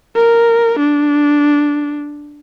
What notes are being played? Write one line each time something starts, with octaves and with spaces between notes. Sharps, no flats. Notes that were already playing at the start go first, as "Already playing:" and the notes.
A#4
D4